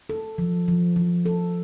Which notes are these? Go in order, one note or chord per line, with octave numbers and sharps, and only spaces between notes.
A4
F3
F3
F3
A4